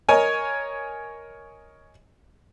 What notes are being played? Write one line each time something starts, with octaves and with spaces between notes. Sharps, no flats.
A#4 C#5 D#5 G#5